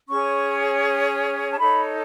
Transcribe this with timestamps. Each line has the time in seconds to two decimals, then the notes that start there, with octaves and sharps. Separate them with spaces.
0.09 C#4 G#4 C#5 C#6
1.52 A5
1.58 D#4 A4 C#5 B5